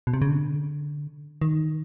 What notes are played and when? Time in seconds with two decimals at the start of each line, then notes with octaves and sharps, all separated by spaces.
0.07 B2
0.14 C3
0.22 C#3
0.29 D3
1.42 D#3